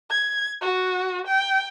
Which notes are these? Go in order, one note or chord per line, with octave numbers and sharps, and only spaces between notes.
G#6
F#4
G5